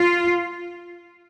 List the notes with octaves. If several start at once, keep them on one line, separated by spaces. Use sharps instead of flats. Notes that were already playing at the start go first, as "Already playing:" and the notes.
Already playing: F4